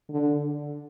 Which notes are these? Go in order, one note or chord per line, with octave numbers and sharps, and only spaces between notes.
D3